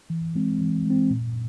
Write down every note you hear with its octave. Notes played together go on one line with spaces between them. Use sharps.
E3
G#3 C4
E3
G#3 C4
A#2